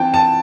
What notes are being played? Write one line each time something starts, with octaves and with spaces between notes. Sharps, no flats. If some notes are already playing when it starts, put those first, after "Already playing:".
Already playing: E3 C4 G5 A5
A5